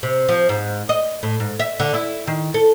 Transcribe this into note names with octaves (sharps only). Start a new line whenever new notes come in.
C3
F3
G#2
D#5
A2
G#2
E5
D3
E4
D#3
A4